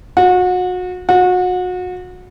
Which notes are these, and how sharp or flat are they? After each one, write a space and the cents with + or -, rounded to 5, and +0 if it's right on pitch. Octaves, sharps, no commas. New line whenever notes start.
F#4 -30
F#4 -30